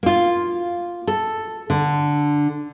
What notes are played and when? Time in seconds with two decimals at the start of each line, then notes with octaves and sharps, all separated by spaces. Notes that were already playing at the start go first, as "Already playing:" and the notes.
0.03 A#3 F4
1.07 A4
1.70 D3